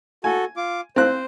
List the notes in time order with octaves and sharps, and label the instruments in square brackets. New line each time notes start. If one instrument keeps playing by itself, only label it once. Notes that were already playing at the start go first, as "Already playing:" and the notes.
[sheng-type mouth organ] F#4 A4 [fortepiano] G#5
[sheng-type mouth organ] F4 D6
[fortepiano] C4 F#6 [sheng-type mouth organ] C5